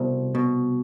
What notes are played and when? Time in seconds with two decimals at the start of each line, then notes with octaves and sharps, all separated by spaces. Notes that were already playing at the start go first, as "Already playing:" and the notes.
Already playing: C2 B2 C5
0.35 B2